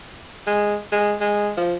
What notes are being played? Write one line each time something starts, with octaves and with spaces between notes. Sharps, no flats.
G#3
G#3
G#3
F3